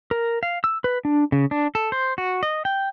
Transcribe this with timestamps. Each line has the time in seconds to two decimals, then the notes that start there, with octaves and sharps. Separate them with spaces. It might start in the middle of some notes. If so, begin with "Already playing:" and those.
0.11 A#4
0.43 F5
0.64 E6
0.84 B4
1.05 D4
1.32 C#3
1.51 D4
1.75 A4
1.92 C5
2.18 F#4
2.43 D#5
2.65 G5